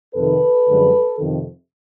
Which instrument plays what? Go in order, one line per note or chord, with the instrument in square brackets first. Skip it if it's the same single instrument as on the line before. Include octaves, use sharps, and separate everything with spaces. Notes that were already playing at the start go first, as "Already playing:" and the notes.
[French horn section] F2 C3 D#3 A4 B4
F#2 D3 F3 G#3
F2 C3 D#3